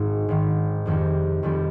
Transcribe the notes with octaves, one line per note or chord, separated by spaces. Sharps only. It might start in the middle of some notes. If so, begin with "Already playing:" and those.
Already playing: G#1 G#2 D#3
G#1 G#2 D#3
F1 F2 D#3 G3 C4
F1 F2 D#3 G3 C4